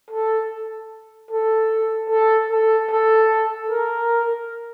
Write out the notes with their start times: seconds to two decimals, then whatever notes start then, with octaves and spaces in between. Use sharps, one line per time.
0.11 A4
1.31 A4
2.10 A4
2.50 A4
2.91 A4
3.70 A#4